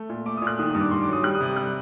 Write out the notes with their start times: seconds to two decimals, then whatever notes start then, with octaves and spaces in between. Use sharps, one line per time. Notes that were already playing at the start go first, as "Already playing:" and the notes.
Already playing: A3
0.09 A#2
0.25 A3 D6
0.37 A#2 D#6
0.47 F#6
0.59 D#3 D#6
0.70 G2 D#6
0.81 D6
0.91 G2 C6
1.03 D6
1.08 F#3 D#6
1.24 G3 F#6
1.35 D#6
1.40 C3
1.46 D#6
1.57 G3 F#6